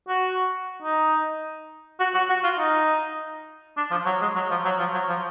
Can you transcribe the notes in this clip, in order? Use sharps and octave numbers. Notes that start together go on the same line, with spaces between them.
F#4
D#4
F#4
F#4
F#4
F4
D#4
D4
F3
F#3
G#3
F#3
F3
F#3
F3
F#3
F3